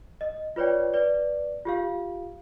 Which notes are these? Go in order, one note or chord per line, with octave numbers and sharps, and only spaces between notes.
D#5
F4 B4 C#5 D5 G5
B4 D5
F4 G4 F5